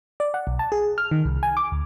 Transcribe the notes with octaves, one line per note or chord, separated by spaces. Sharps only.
D5
F#5
B1
A5
G#4
F6
D#3
C2
G#5
D6
D2